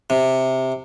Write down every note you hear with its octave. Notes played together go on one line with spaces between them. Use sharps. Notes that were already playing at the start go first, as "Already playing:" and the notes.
C3